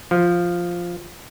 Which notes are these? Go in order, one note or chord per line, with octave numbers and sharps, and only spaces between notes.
F3